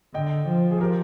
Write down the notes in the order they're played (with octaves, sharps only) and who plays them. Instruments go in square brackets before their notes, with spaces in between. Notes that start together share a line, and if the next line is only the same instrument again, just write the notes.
[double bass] D3 [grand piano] D#5 G5
[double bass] F3
[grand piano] G#4
G4 A#4